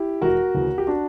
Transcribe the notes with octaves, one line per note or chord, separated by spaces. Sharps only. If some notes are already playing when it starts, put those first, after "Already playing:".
Already playing: E4 G4
E1 F#4 A#4
D2 C#3 E3
G4
D4 F#4